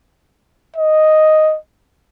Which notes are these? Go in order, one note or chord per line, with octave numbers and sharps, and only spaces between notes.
D#5